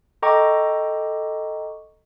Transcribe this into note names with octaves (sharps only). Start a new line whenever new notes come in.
A4 D#5 G5 A#5 C#6 D6